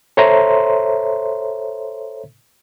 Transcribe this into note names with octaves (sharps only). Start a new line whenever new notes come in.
A4 C5 C#5 E5 A#5 C6